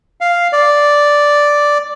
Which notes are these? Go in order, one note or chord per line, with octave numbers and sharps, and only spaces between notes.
F5
D5